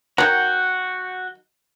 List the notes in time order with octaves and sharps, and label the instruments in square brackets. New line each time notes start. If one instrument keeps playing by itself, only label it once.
[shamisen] D#3 F#3 [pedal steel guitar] F#4 F#5 G6